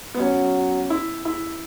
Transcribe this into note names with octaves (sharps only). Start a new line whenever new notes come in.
B3
F#3 C#4
E4
E4